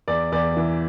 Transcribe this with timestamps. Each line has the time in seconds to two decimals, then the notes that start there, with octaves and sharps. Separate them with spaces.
0.08 E2 D5
0.32 E2 D5
0.57 E3